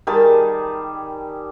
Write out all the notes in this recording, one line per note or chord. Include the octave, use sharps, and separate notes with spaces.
D#3 G3 G#4 A5